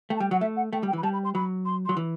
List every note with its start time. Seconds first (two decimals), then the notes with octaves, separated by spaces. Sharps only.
0.10 A3 G5
0.16 A5
0.20 G3 G5
0.31 F#3 F#5
0.41 A3 E5
0.56 F#5
0.73 A3 G5
0.83 G3
0.87 G5
0.93 E3
0.98 B5
1.03 G3 A5
1.13 B5
1.24 C6
1.35 F#3 B5
1.65 C6
1.86 F#3 C6
1.97 E3